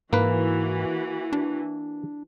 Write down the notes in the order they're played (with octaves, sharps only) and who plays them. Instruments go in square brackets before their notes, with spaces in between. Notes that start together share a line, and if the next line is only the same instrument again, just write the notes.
[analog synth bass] G#2 [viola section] E3 F#4 [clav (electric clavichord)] A#3 B4
[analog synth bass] D4